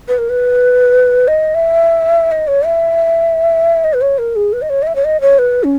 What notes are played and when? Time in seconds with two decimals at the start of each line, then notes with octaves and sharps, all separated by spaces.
0.08 B4
0.18 A#4
0.29 B4
1.28 D#5
1.54 E5
2.31 D#5
2.47 C#5
2.65 E5
3.84 D#5
3.93 B4
4.01 C#5
4.18 A#4
4.36 G#4
4.53 B4
4.62 D#5
4.70 C#5
4.82 D#5
4.87 E5
4.95 C#5
5.04 D#5
5.21 C#5
5.38 B4
5.64 C#4